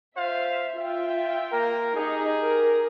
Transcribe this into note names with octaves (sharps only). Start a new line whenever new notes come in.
F4 C5 E5 F5
F4 E5 G5
A#3 A#4
D#4 G4 G#4
A#4